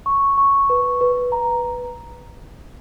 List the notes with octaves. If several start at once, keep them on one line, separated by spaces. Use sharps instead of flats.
C#6
C#6
B4
B4
A#5